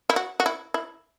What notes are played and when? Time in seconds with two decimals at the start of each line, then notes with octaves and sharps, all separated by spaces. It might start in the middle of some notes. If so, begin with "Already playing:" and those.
0.10 E4
0.16 F#4
0.40 F#4
0.46 E4
0.74 E4